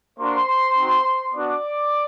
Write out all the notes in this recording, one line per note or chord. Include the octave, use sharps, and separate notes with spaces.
A#3 D4 F#4 C5 C6
C4 D#4 F#4
B3 D4 F#4 D5 D6